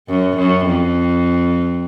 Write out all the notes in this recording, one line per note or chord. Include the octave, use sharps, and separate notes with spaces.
F#2
F#2
F2